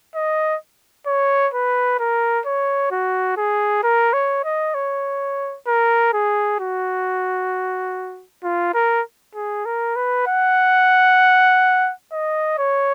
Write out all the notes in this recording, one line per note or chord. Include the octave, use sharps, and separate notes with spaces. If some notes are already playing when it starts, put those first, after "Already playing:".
D#5
C#5
B4
A#4
C#5
F#4
G#4
A#4
C#5
D#5
C#5
A#4
G#4
F#4
F4
A#4
G#4
A#4
B4
F#5
D#5
C#5